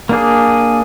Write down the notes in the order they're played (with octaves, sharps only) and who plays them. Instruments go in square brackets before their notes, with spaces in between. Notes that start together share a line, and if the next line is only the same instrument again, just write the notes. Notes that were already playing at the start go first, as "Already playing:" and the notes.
[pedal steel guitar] A#3 D4 G#4